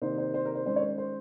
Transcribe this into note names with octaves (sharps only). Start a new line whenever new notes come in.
C3 D#3 A#3 D#4 C5
C5
C5
A#4
C5
D#3 G#3 C#4 C5
C#5
C5
C5